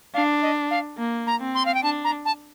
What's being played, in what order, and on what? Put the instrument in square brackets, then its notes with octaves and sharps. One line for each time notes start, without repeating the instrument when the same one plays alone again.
[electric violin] D4 [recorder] F5
[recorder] D#5
F5
[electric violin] A#3
[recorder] A#5
[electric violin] C4
[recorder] C6
F5
G5
[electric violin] D4 [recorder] A5
[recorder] A#5
A5